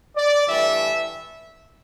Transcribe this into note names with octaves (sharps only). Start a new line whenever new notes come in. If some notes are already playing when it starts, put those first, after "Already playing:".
D5
G2 E3 A3 E5